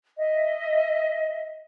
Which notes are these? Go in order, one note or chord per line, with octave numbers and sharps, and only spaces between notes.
D#5 E5